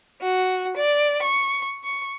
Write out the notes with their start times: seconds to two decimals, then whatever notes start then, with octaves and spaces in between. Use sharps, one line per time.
0.21 F#4
0.76 D5
1.21 C#6
1.84 C#6